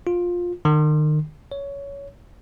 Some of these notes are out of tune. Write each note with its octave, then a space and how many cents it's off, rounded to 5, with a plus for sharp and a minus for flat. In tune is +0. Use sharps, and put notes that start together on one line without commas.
F4 +15
D#3 -35
C#5 +15